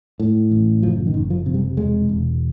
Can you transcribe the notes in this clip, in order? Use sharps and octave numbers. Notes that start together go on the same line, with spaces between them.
A2
A1
F#1 F3
D#3
F#1
F3
C3
G3
E1 G#3
E1